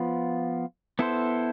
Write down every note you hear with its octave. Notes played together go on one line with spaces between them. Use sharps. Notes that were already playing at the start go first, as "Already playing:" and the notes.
Already playing: F3 B3 F4
B3 E4 A4 C5